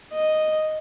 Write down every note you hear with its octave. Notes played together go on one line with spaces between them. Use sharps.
D#5